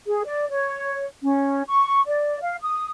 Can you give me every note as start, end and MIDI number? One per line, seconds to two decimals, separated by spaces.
0.07 0.24 68
0.25 0.46 74
0.50 1.06 73
1.22 1.62 61
1.67 2.01 85
2.06 2.41 74
2.41 2.55 77
2.62 2.89 87